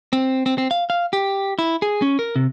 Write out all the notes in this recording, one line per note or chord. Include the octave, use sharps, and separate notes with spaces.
C4
C4
C4
F5
F5
G4
E4
G#4
C#4
A#4
C3